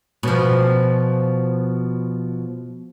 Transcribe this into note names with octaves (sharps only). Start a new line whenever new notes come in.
B2 F3